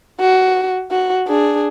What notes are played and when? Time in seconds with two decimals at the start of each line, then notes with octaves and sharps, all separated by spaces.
0.20 F#4
0.92 F#4
1.28 D4 G#4